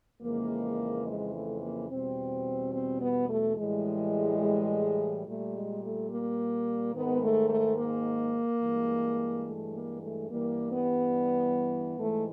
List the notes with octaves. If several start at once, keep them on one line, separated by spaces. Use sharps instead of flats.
F2 C#3 E3 G#3 A#3
G#3
A3
A#3
E2 B2 G3 C4
C4
B3
A3
A2 E3 G3 G#3
A#2 G3 A3
G#3
A3
A#3
G#2 D#3 G#3 B3
A3
A3
A#3
G2 E3 G#3
A3
A#3
A3
G2 E3 G3 A#3
B3
G#2 E3 G#3 A3